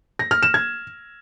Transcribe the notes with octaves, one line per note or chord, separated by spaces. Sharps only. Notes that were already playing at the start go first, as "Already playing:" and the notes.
A#6
F6
E7
G#6